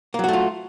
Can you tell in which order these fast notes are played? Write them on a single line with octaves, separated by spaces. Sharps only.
A#3 F#3 F#4 A3 F4